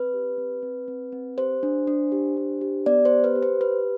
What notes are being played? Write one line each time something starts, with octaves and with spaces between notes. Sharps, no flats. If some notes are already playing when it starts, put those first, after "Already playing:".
Already playing: C4 B4
G4
C4
C4
C4
C4
G4 C5
D4
D4
G4
D4
G4
B3 D5
C5
G4
B4
G4
C5
G4 B4